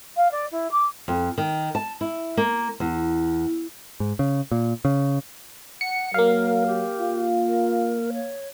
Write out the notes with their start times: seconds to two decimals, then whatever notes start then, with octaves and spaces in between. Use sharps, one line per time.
0.16 F5
0.31 D5
0.51 E4
0.71 D6
1.08 F2
1.38 D#3
1.75 A5
2.01 E4
2.37 A#3
2.80 E2
4.00 G#2
4.19 C#3
4.52 A#2
4.85 C#3
5.81 F#5 C#7
6.14 F#3 A#3 A#4 F5
6.67 G4
7.00 F4
7.46 A#4
8.13 C#5